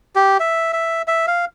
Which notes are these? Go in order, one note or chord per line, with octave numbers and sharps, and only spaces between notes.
G4
E5
E5
E5
F5